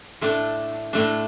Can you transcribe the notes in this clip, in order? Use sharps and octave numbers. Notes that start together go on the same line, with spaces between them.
A2 A3 D4
A2 A3 D4